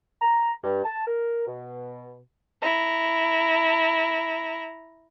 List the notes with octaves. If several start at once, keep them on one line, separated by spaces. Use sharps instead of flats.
A#5
G2
A5
A#4
B2
E4 A#5